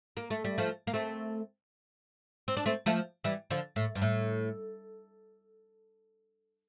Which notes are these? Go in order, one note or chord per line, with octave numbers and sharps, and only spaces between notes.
A#3
A3
G3
F3 A3
A#3
A3 C4
C4
D4
A3 C4
F3 A3
E3 G3
D3 F3
A2
G2
A2